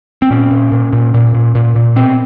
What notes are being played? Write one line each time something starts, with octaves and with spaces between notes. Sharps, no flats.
C4
A#2 C#4
A#2
A#2
A#2
A#2
A#2
A#2
A#2
B2 C4